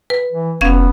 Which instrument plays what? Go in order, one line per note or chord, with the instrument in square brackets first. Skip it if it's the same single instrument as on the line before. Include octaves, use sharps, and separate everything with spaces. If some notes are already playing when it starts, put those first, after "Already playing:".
[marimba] B4
[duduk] E3
[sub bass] F1 [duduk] B3 [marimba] C#4 F5 G#6